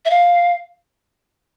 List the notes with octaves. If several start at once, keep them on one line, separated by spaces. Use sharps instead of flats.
E5
F5